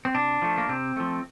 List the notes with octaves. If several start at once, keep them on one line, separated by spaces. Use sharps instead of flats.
C4
C3 D4
F3 A3
A#3
C3 C4
F3 A3